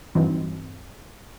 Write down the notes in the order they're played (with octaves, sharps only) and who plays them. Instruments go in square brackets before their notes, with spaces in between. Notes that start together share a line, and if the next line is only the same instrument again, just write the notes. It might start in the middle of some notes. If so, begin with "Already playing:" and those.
[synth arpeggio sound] G2 E3 F#3 C4 D#4